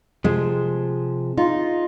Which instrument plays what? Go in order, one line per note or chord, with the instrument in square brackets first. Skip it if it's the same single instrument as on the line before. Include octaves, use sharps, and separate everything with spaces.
[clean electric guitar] C3 F3 [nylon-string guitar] G#3
[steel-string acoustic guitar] D#4 [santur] F4